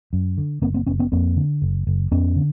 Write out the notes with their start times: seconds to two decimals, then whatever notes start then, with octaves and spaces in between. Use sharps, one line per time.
0.13 F#2
0.38 D3
0.62 F#1 A#3 C4
0.74 A#3 C4
0.87 F#1 B3 C#4
0.99 B3 C#4
1.12 F2 A#3 C4
1.37 D3
1.62 F#1
1.87 F#1
2.11 F2 B3 C#4
2.36 D3